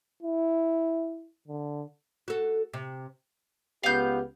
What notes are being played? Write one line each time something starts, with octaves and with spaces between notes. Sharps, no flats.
E4
D3
F#4 A4
C3
C#2 B3 G4 F5 G6